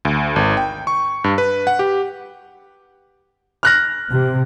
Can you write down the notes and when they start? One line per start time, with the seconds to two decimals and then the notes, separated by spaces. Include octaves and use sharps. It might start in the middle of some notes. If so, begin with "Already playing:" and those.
0.05 D2
0.36 G#1
0.57 G5
0.87 C#6
1.24 G2
1.38 B4
1.67 F#5
1.79 G4
3.63 F6 F#6 A#6
4.10 C3